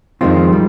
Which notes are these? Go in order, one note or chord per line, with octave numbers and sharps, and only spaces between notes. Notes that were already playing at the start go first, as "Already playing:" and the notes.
F2 D#3 G#3 C4 F4
G3